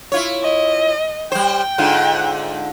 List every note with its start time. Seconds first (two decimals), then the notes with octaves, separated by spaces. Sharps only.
0.12 E4 F4 C#5
0.43 D#5
1.32 G3 C5 G5
1.78 G#2 D3 F4